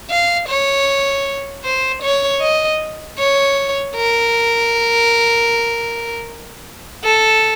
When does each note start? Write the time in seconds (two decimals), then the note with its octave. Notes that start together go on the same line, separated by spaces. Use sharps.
0.10 F5
0.49 C#5
1.65 C5
2.02 C#5
2.41 D#5
3.19 C#5
3.96 A#4
7.04 A4